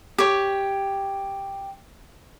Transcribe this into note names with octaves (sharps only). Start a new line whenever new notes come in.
G4 C#5